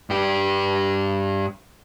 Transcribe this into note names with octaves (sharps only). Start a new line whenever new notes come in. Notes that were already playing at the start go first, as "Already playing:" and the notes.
G2 G4